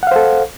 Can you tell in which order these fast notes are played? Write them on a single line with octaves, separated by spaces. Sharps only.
F#5 F5 C5 A4